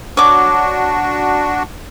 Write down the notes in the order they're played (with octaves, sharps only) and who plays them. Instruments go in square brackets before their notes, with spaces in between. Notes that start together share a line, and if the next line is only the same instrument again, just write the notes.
[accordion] D4 F#4 [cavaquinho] C#5 D6